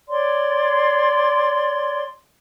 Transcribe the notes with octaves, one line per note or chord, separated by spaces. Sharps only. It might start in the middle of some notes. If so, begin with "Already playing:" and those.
C#5 D5 C6